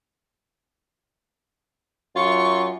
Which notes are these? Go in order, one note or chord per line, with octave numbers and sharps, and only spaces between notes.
F#2 F4 C#6